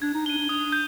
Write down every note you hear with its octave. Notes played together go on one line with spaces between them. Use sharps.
D4 G#6
D#4
D4 D#7 G7
D4
D4 D#6
G6